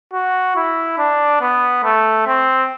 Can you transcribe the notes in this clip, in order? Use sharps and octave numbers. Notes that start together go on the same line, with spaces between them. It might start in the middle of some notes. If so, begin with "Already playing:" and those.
F#4
E4
D4
B3
A3
C4